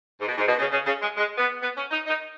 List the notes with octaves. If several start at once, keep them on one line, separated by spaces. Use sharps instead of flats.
G#2
B2
G#2
B2
C#3
C#3
C#3
G#3
G#3
B3
B3
C#4
D#4
D#4